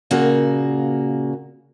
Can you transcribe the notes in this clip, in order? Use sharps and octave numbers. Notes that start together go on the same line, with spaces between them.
A#2 C#3 A#3 F#4